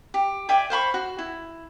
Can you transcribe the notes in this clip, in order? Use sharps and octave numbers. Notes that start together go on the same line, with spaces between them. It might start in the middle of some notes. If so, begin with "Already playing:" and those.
G4
D5 E5 G5 G#5
C5 F5 B5 C#6
F#4
E4